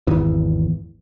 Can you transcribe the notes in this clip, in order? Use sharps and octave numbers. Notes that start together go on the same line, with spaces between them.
G#1 E2 E3